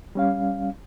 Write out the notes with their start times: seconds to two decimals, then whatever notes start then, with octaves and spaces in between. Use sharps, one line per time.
0.15 G3 C#4 F5